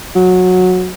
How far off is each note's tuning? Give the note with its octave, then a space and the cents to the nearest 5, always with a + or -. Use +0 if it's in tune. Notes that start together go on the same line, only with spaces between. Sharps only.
F#3 -15